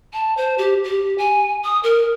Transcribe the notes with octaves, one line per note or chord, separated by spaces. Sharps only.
A5
C5
G4
G4
G#5
D#6
A#4